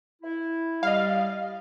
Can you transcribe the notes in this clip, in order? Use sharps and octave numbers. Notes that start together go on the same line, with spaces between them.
E4
G3 D#5 F5